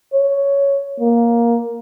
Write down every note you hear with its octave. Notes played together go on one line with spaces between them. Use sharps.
C#5
A#3